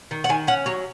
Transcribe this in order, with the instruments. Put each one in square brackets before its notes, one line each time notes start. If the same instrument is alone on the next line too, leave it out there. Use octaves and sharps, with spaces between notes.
[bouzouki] D#3
F#5
D#3 G#5
C#4 F#5
F#3 C#5